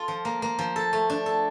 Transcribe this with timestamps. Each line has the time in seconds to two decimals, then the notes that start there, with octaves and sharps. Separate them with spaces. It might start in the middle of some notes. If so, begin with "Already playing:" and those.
Already playing: F4 A4
0.08 F3
0.25 A#3
0.42 A#3
0.59 F3
0.76 A4
0.93 A3
1.10 D4
1.26 A4